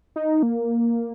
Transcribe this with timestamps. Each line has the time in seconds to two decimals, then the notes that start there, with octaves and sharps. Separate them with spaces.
0.16 D#4
0.43 A#3